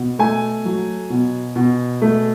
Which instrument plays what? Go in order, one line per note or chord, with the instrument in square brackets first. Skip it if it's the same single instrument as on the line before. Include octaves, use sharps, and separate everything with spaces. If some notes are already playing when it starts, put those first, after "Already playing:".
Already playing: [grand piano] B2
A3 G#5
F#3
B2
B2
A3